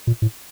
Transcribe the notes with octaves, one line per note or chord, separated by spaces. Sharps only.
A#2
A2